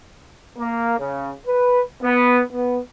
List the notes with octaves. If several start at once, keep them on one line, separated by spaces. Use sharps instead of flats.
A#3
C#3
B4
B3
B3